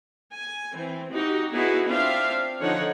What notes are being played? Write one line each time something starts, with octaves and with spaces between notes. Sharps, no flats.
G#5
E3 C4
D#4 F#4 G4
B3 D#4 E4 F#4 G#4 B4
C4 D4 F4 E5 F5
D3 F3 D#4 C#5 F#5